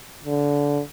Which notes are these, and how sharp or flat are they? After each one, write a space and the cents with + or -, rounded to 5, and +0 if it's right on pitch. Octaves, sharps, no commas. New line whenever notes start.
D3 -20